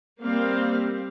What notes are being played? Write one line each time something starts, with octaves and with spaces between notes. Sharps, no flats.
G3 A#3 C4 F5